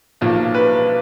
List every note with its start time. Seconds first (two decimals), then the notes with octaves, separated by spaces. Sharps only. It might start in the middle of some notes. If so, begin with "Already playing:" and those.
0.21 B1 A#2 F3 A#3
0.54 B4